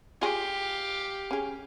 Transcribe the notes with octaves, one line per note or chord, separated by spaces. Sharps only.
F4 G4 G#4 F5
C#4 G#4